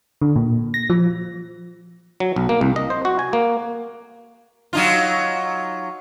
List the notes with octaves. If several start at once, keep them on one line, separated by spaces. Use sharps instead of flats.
D3
A#2
A#6
F3
F#3
B1
A#3
C2
D#5
C5
F#4
G#5
A#3
F#3 D#4 F4